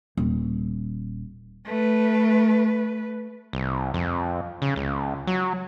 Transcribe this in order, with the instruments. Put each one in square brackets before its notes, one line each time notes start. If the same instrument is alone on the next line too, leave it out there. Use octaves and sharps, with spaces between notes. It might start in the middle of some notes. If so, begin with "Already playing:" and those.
[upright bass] D#1
[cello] A3 B4
[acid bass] C2
F2
C#3
C#2
F#3